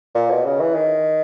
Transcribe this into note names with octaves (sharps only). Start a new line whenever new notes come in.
A#2
B2
C#3
E3
D#3